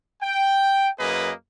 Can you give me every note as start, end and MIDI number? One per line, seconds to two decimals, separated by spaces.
0.23 0.88 79
1.00 1.32 42
1.00 1.32 58
1.00 1.32 68
1.00 1.32 71
1.00 1.32 75